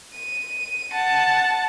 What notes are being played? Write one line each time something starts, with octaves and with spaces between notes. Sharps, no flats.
D#7
F#5 A5